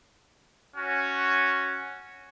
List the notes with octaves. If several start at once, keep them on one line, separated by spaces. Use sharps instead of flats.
C#4 F#4